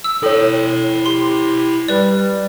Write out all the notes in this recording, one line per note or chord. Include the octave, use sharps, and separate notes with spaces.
E6
E4 A4 C#5 G5
G4 C6
G3 B4 D5